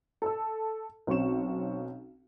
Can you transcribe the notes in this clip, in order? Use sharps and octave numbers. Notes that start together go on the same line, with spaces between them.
A4 A5 E6
B1 C4 C#4 C#6 E7